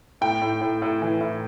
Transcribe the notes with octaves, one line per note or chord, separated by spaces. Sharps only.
A2 G5
A2
A2
A2
E3
A2